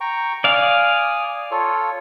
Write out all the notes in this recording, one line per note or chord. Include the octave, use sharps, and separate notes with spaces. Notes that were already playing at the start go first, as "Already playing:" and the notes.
G5 A#5 C#6
D5 F5 G#5 D#6
F4 A4 C#5